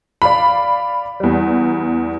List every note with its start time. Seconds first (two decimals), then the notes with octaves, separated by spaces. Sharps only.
0.22 D5 F5 B5
1.20 E2 G3